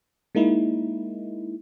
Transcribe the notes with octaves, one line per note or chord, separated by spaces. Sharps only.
G#3 A#3 D#4 E4